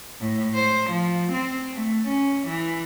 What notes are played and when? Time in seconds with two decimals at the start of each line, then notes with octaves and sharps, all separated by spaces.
0.21 A2
0.55 C5
0.91 F3
1.33 C4
1.73 A3
2.08 C#4
2.48 E3